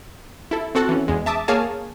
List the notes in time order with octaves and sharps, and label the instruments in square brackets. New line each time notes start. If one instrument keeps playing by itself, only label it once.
[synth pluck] E4 A4
C4 F#4 A4 F#5
E3 C#4
E2 G#3
E5 A5 D6 D#6
A#3 G#4 C#5 F5 G#5 A5